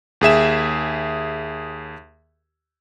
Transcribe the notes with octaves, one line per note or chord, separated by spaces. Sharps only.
D#2 G#4 E5 E7